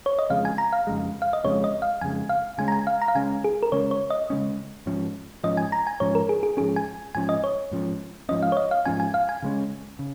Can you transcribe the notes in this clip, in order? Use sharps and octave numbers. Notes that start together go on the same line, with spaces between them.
C#5
D#5
F2 C#3 G#3 F5
G#5
A#5
F5
F2 C#3 G#3
F5
D#5
F2 C#3 G#3 C#5
D#5
F5
F2 C#3 G#3 G#5
F5
C#3 G#3 C#4 G#5
A#5
G#5
F5
A#5
F5
C#3 G#3 C#4 G#5
G#4
A#4
C#3 G#3 C#4 C#5
C#5
D#5
C#3 G#3 C#4
G#2 F3 C#4
G#2 F3 C#4 D#5
G#5
A#5
G#5
G#2 F3 C#4 C#5
A#4
G#4
G#4
G#2 F3 C#4 G#4
G#5
G#2 F3 C#4 G#5
D#5
C#5
G#2 F3 C#4
G#2 F3 C#4 D#5
F5
C#5
D#5
F5
G#2 F3 C#4 G#5
G#5
F5
G#5
C#3 G#3 C#4
C#3